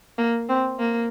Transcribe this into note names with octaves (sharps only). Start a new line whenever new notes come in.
A#3
C4
A#3